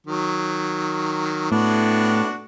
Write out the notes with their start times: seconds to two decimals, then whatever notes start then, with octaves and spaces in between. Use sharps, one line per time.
0.07 D#3 F#3
1.52 A2 B3 D4 F#4